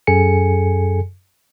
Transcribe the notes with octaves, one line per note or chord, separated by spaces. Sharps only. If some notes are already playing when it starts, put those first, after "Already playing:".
F#2 G#4 A4 G#5 C#7